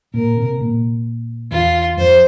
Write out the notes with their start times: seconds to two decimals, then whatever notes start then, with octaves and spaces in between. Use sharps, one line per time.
0.14 A#2 A#4
0.37 C3
0.61 A#2
1.51 E2 F4
1.97 F2 C5